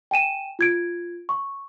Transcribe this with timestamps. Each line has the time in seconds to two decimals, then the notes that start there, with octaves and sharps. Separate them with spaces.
0.11 G5 G#5 D#7 E7
0.59 F4 G#6 D7
1.29 C#6